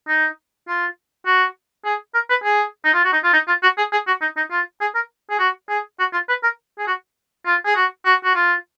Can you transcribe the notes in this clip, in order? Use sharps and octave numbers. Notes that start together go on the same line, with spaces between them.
D#4
F4
F#4
G#4
A#4
B4
G#4
D#4
F4
F#4
D#4
F4
D#4
F4
F#4
G#4
G#4
F#4
D#4
D#4
F4
G#4
A#4
G#4
F#4
G#4
F#4
F4
B4
A#4
G#4
F#4
F4
G#4
F#4
F#4
F#4
F4